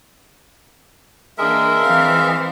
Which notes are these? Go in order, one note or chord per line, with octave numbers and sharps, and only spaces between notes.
E3 G#3 A#3 D4 A#4 E5
E3 C4 F5